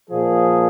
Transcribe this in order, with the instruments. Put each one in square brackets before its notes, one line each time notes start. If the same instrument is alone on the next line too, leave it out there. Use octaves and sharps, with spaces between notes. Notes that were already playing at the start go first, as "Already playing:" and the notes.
[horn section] A#2 F3 G#4